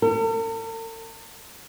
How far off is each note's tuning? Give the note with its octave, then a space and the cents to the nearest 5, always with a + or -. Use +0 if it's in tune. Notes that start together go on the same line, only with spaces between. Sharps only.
A4 +45